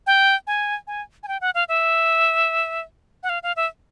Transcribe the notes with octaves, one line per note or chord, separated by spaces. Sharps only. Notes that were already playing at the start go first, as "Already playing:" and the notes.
G5
G#5
G#5
G#5
G5
F#5
F5
E5
F#5
F5
F5
E5